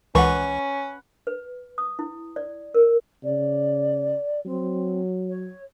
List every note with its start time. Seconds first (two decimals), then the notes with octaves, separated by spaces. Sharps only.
0.15 C#2 E3 C#4 B4 F#5 C#6
1.27 B4
1.78 D#6
1.99 E4
2.36 D5
2.74 A#4
3.24 C#3 D5
4.46 F#3 C4
5.30 C#5